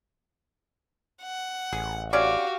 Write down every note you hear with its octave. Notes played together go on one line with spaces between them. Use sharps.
F#5
A1 G#4
D3 C#4 F#4 G4 D5 F5